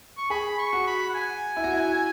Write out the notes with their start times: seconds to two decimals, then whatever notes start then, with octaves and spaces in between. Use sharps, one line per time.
0.18 C#6
0.30 G#4 B5
0.59 C#6
0.73 F#4
0.87 B5
1.10 F#5
1.14 G#5
1.57 E4
1.64 F#4
1.73 E4